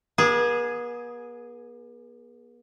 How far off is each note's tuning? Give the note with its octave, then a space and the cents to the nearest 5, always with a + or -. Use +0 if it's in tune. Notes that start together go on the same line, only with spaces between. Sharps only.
B3 -45 G#4 +0